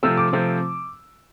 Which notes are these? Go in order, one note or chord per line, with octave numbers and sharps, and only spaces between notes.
C3 F3 A3 C4 E6
D6
C3 F3 A3 C4